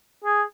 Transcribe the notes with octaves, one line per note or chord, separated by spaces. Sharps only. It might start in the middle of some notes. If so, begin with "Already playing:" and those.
G#4